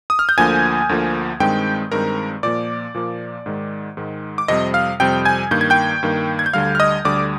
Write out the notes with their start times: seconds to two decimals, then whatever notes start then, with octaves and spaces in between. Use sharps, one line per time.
0.10 D#6
0.19 F6
0.29 G6
0.38 D2 D3 F3 A#3 G#5 G#6
0.89 D2 D3 F3 A#3
1.40 G2 D#3 G#3 C4 G5 G6
1.92 G2 D#3 G#3 C4 A#4 A#5
2.43 A#2 F3 A#3 D5 D6
2.95 A#2 F3 A#3
3.46 G#2 D#3 G#3
3.97 G#2 D#3 G#3
4.38 D6
4.48 F2 C3 G3 C4 D#5 D#6
4.74 F5 F6
5.00 F2 C3 G3 C4 G5 G6
5.25 G#5 G#6
5.51 G2 D#3 A#3 G6
5.61 G#6
5.70 G5 G6
6.03 G2 D#3 A#3
6.39 G#6
6.46 G6
6.53 D2 D3 G3 F5 F6
6.75 F6
6.80 D#5 D#6
7.05 D2 D3 G3 D5 D6